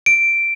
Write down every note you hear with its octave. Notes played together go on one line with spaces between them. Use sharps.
D7